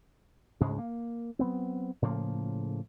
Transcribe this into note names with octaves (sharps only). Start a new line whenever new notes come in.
D2 G#2 C#3 G#3
A#3
F#3 B3 C4
A2 C#3 F3 A#3